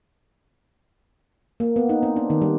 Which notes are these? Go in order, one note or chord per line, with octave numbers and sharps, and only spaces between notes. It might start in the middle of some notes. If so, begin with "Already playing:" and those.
A#3
B3
D#4
C4
D4
D#3
G3